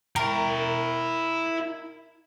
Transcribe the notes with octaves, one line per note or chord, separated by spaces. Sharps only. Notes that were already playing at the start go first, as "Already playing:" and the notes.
E4 A#4 G5